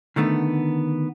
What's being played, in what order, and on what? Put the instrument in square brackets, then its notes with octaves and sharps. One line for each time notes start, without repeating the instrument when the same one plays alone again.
[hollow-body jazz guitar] D3 D#3 A3 B3